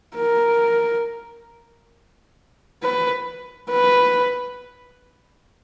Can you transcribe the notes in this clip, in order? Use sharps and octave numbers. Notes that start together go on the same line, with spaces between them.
A#4
B4
B4